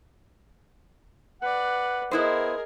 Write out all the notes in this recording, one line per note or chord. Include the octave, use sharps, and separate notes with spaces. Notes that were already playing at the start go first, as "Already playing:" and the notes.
B4 D5 F#5
B3 E4 G#4 A#4 C5 D#5